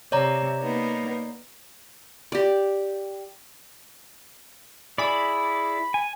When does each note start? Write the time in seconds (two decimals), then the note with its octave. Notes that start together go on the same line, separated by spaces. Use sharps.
0.12 C3 C#5 D5 A#5
0.63 A#3 B3 D#4
2.32 G4 D5
4.98 E4 G#4 D5 B5
5.94 G#5